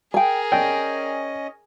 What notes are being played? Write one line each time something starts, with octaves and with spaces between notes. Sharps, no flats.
G#4 A#4 G5 G#5
C#4 D5 D#5 G5